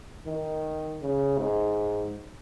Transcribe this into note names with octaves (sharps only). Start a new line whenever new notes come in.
D#3
C#3
G#2